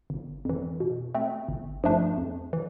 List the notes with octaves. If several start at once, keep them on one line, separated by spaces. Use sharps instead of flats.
G1
F2 E3
B2
A3 C4
G1
G2 F3 A3 D4
F2
E3